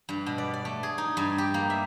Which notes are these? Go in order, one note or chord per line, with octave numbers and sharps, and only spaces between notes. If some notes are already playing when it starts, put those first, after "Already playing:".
G2
B2
D5
D5
A3
G#4
D#4
G2
G4
A#3
E5